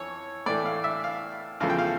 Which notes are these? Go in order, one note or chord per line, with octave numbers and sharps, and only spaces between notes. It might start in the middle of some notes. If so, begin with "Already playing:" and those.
Already playing: F2 E3 C#5
A2 E3 A3 D5
F5
E5
F5
E2 C#3 F3 A3 F5
G5
F5